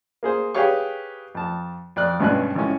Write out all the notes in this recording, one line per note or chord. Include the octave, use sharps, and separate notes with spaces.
A#3 G#4 C5
G4 G#4 B4 C#5 F5 C#6
F2 A5
F2 D5 F#6
G#1 G2 B2 C#4 D5 F#6
G#1 A2 C#4